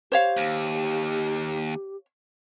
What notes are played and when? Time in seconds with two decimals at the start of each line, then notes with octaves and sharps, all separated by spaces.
0.12 G4 C5 C#5 F5
0.37 D#2